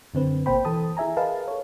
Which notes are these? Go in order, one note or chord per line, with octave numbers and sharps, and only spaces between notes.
F#2 D3 C4 B4
G#1 B2 A#3 C5 G5 B5
E3 A4 A5 D#6
E4 G#4 E5 G#5 A#5
G#4 A#4 B4 D#5 F5 A5
A4 C#5